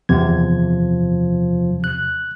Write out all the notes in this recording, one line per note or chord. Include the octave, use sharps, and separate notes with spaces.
E2 C3 F3 G#6
F#6